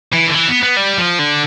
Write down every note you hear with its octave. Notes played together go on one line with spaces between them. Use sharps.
E3
D3
E3
B3
B3
G3
F3
D3